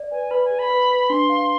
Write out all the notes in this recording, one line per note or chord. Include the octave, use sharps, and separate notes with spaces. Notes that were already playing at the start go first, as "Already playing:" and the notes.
Already playing: D5
B4 G#5
B4 B5
G#5
G#4
B5
B4
B4
D4 C6
F5